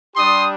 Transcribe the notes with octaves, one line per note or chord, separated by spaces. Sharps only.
G3 D4 G4 C6 D#6